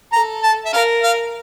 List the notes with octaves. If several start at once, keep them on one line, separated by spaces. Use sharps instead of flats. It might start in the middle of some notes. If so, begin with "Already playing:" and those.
A4 A#5
A5
E5
A#4 F5
F5